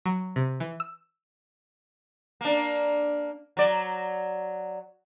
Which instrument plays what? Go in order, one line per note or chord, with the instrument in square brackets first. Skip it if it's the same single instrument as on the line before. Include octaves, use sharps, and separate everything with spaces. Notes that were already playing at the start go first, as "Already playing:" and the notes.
[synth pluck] F#3
C3
E3
E6
[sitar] A#3 D4
F#3 D5